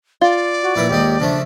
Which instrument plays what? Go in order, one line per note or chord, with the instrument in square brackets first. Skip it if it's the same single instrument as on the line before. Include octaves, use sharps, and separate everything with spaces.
[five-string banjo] F4 [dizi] D5
[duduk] F#4
[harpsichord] A#1 A#3 B4 [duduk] E4
[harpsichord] D#2 G#2 D#4 [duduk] G4
[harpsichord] C#3 F3 A3 [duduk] D4